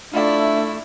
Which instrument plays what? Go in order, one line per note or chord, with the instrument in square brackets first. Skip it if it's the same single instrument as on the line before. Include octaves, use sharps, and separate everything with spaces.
[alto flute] A3 [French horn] D4 [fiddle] E4 [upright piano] F4 D5